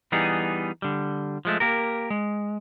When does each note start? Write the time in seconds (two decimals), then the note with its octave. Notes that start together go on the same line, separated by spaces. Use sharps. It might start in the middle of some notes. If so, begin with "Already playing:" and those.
0.12 E3 G3 B3 D#4 G#4
0.82 D3 G3
1.45 F3 G#3 A3
1.60 A#3 G4 A#4
2.10 G#3